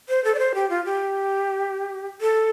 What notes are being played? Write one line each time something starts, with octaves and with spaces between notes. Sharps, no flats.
C5
A4
D5
C5
G4
F4
G4
A4